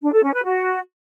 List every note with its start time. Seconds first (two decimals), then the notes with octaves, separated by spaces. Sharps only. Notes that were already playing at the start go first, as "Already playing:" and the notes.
0.02 D4
0.13 A4
0.23 C#4
0.34 B4
0.44 F#4